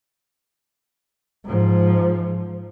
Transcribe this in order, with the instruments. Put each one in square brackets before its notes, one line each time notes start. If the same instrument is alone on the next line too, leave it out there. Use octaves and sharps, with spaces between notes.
[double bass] G#2 F3